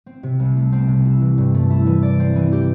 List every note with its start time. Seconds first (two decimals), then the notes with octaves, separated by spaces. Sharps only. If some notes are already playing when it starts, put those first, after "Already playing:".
0.06 C4
0.23 C3
0.40 C2
0.56 A3
0.72 C4
0.88 C3
1.05 E4
1.21 E3
1.38 G2
1.54 A3
1.70 E4
1.86 E3
2.03 D5
2.20 C4
2.35 E3
2.52 G4